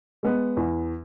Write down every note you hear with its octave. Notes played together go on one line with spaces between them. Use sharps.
G#3 B3
E2